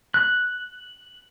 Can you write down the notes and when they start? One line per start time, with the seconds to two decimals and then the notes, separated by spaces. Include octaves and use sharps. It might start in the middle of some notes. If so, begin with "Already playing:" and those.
0.14 F#6